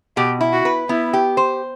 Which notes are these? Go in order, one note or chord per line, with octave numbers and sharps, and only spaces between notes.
B2 G4
E4
F#4
B4
B3 E4
G4
C5